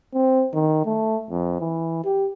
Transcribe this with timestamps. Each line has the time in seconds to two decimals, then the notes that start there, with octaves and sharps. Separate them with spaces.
0.14 C4
0.54 D#3
0.85 A3
1.30 F2
1.60 E3
2.05 G4